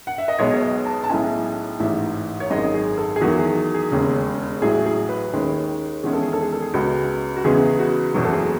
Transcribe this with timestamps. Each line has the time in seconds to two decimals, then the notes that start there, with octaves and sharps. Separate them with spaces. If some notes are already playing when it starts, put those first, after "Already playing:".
0.07 F#5
0.18 E5
0.28 D#5
0.39 B1 B2 G#3 B3 C#5
0.54 C#5
0.63 D#5
0.86 A5
1.04 A5
1.09 B1 A2 G#3 C#4 G#5
1.80 A1 G#2 E3 E5
2.40 C#5
2.50 G#1 F#2 D#3 G#3 D#5
2.74 G#4
2.97 A4
3.16 G#4
3.21 E2 D#3 F#3 F#4
3.39 G#4
3.74 G#4
3.91 E1 D#2 C#3
4.62 A1 A2 F#3 G#4
4.86 G#4
5.09 B4
5.33 D#2 D#3 G#3 C#4
6.03 E1 E2 D#3 G#3 C#4 G#4
6.13 A4
6.23 G#4
6.33 A4
6.42 G#4
6.52 A4
6.62 G#4
6.74 C#2 C#3 G#3 B3 F#4
7.36 F#4
7.44 E2 C#3 G#3 B3 G#4
7.79 F#4
8.14 F#1 E2 B2 F#3
8.24 A4
8.33 G#4